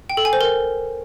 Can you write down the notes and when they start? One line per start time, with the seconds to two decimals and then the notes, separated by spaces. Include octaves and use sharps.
0.10 G5
0.17 A4
0.25 G#5
0.33 C5
0.41 A#4